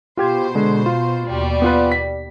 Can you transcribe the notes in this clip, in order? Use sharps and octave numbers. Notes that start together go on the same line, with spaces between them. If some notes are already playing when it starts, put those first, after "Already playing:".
B2 F4 G4 C5 G#6
D3 G#3
F4
D#2 B2 G3
B3 F4 B4
B6